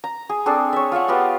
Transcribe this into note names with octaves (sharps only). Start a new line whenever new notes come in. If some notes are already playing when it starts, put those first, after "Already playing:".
A#5
G#4
C4 D4 G#4 A4
C#5 E5
F4 C#5 E5 F#5
B3 F4 G4 D#5